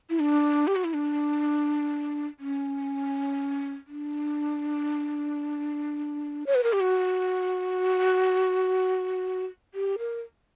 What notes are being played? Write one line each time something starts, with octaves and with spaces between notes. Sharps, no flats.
E4
D4
G4
F#4
E4
D4
C#4
D4
C#5
B4
A#4
G4
F#4
G4
A#4